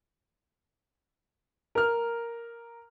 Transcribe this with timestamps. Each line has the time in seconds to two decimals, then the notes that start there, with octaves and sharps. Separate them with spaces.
1.75 A#4 F6